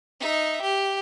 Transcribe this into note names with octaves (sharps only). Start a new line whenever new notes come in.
D#4 E5
G4